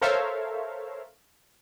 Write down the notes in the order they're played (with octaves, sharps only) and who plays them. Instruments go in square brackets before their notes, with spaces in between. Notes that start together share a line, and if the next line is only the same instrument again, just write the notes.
[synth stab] A4 A#4 C5 C#5 E5 F5